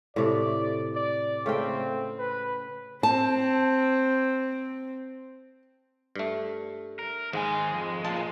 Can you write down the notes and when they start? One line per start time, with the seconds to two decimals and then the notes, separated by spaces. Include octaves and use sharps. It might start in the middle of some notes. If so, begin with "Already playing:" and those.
0.16 A2 C3 A3 D5
0.95 D5
1.46 C#3 A3 C4 G5
2.18 B4
3.03 C4 A5
6.16 G2 A3
6.99 A#4
7.33 G#2 D#3 G#3 F5 G#5
7.73 F2
8.05 A#2 C#3 F4 A5